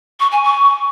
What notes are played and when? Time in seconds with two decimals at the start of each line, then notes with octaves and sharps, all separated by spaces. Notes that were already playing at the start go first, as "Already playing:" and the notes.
0.19 C#6
0.31 G#5
0.43 C#6